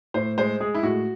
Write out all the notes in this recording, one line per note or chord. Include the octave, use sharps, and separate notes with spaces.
A2 C5
G#3 C5
G#3 G#4
E4
A2 F#4